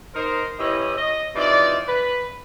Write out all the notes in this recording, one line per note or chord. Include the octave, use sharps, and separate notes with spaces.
D#4 A#4 C5
E3 C#4 E4 G4 D#5
D#5
C3 E3 D#4 F4 D5
B4